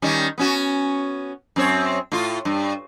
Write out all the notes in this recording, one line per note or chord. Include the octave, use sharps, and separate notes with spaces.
D#3 G3 C#4
B3 C#4 F#4
F#2 C4 C#5
A2 F4
G2